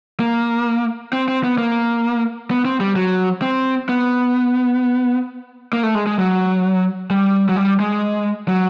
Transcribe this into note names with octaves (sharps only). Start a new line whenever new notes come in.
A#3
C4
C4
B3
A#3
B3
C4
G3
F#3
C4
B3
A#3
A3
G#3
G#3
F#3
G3
F#3
G3
G#3
F#3